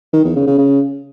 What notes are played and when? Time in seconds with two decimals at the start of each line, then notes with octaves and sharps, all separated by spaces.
0.13 D#3
0.25 E2
0.36 C#3
0.47 C#3
0.58 C#3